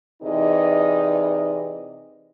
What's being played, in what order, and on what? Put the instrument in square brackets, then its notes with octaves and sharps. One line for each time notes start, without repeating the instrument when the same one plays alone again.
[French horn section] C3 E3 D#4 G#4 D5 D#5